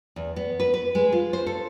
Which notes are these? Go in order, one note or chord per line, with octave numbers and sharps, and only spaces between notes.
E2
B3
B4
B4
G#3
F4
C5
A4